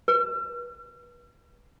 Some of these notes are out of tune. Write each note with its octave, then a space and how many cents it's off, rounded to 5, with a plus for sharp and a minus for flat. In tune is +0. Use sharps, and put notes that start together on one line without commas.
B4 -35